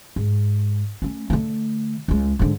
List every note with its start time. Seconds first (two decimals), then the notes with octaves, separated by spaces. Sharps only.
0.16 G#2
1.02 A3 C#4
1.30 D3 A3
2.08 C#2 G#3
2.39 G#2 D3